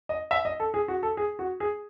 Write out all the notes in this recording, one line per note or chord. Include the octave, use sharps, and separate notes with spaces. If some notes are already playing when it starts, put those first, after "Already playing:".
D#5
E5
D#5
A4
G#4
F#4
A4
G#4
F#4
G#4